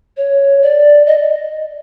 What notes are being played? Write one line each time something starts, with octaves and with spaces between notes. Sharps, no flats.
C#5
D5
D#5